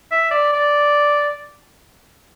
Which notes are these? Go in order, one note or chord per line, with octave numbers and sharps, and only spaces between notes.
E5
D5
D5